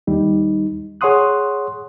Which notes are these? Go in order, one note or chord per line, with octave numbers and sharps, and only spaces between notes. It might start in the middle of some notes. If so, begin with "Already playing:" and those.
D#2 G3 D#4
G#4 C#5 F#5 C6 D#6 F#6